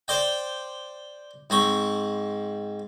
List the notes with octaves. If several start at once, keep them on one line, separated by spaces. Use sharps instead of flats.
C5 D5 G5
G#2 C4 C#6